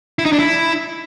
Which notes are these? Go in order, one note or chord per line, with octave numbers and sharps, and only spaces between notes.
E4
D#4
D4
E4